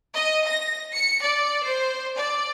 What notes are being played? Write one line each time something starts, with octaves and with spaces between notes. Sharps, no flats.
D#5
A#6
C#7
D5
C5
D5